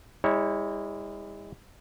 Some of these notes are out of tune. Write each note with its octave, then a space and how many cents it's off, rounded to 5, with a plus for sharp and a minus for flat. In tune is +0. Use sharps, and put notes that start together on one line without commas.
G#3 -45 E4 -30 C#5 +0